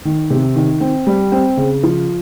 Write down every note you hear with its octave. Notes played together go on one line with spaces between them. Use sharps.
D#3
C3
D#3
C4
G3
C4
C#3
F3